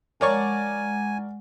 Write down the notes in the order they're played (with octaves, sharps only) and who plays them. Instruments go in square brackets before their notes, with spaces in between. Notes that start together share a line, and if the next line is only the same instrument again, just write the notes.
[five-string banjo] F3 C#5 [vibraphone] G#3 F#5 [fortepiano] A#4 D5 C#6 [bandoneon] G#5